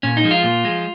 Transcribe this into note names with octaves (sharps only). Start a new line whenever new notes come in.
A#2 C#4
D#4
F3 G#3
F4
A#2
F3 G#3